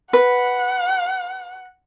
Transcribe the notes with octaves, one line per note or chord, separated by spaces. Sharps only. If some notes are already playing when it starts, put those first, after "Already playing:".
B4 F#5